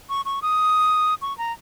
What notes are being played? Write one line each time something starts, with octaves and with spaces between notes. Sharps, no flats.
C#6
C#6
D#6
C#6
A#5